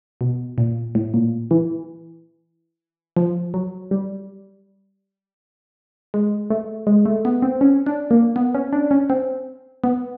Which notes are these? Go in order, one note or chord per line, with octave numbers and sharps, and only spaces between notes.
B2
A#2
A2
A#2
E3
F3
F#3
G3
G#3
A3
G#3
A3
B3
C4
C#4
D4
A#3
B3
C#4
D4
C#4
C4
B3